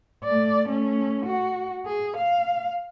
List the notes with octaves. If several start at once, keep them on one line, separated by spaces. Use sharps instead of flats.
A3 D5
A3 C#4
F#4
G#4
F5